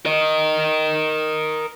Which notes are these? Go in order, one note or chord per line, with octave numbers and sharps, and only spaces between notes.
A#4 D#5